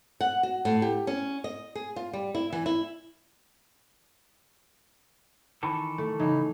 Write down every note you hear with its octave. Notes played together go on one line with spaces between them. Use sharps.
F#5
F#4
A2
G4
C#4
D#5
G#4
F4
G3
E4
E3
E4
D#3 E3 A4
A3
A2 C#3 E3 D#4